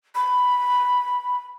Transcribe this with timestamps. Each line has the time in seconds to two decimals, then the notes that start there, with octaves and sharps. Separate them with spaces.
0.15 B5